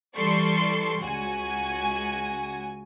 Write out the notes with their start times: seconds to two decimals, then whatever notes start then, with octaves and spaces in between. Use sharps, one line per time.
0.16 E3 G3 A4 D5 C6 C#6
1.02 C#2 F#4 G#5